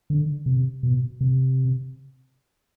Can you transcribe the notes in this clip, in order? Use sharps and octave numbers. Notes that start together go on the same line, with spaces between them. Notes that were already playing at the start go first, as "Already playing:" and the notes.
D3
C3
B2
C3